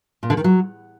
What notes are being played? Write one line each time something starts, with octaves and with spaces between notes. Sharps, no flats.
A#2
D3
D#3
F#3